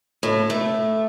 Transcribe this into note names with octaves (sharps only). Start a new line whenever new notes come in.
A2
A3